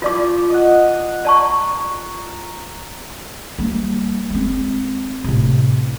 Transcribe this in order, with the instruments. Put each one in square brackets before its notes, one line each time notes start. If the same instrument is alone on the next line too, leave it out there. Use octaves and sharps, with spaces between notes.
[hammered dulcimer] F3 [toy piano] F4 D5 D6
[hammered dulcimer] D#5 F#5
[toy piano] D5 A5 C#6 [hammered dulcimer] A#5
[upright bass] G3 A#3
G#3 C4
A2 C3